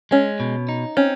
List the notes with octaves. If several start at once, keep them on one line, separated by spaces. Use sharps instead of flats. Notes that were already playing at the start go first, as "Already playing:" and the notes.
G#3 C#4
B2
D#4
C4 C#4